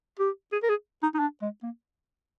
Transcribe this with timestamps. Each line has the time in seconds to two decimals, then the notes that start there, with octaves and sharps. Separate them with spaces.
0.20 G4
0.52 G#4
0.63 A#4
0.69 G#4
1.03 D#4
1.14 D#4
1.19 D4
1.42 G#3
1.63 A#3